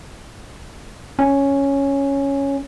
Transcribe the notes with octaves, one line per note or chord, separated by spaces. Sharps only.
C#4